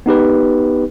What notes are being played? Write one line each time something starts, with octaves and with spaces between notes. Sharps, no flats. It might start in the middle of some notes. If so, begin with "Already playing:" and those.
B3 D#4 G4 B4